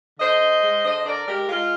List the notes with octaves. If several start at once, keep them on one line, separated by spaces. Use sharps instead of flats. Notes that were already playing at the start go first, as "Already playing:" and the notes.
D3 C5 D#5
D3
G#3
D3 C5 D#5
D#5
D3 A#4 D5
G#3 G4 A#4
G#3 F4